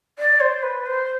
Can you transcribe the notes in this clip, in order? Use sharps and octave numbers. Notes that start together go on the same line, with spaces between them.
D5
C5
B4
C5